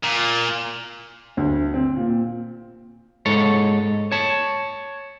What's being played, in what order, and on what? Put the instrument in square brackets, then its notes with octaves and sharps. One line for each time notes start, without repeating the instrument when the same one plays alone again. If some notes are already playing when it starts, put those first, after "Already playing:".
[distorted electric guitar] A#2
[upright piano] D2
C4
A#2
[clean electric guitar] G#2 A4 C#5
C#5 A5